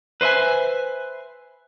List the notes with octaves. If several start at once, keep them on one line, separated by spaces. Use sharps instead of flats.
B4 C5 D#5 E5 G#5